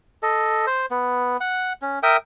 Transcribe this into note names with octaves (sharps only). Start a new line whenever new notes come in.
A4 D#5
C5
B3
F#5
C#4
A#4 E5 G5 D#6